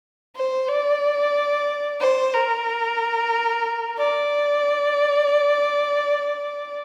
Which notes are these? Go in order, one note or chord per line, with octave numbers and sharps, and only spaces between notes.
C5
D5
C5
A#4
D5